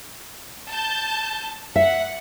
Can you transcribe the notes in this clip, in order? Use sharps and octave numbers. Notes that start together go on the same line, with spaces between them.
A5 G6
E5 F#5